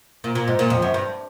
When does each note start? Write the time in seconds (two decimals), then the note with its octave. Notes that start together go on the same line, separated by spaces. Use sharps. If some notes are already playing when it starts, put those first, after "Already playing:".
0.24 A#2
0.35 A#2
0.48 G#2
0.59 A#2
0.70 F2
0.82 F#2
0.94 G2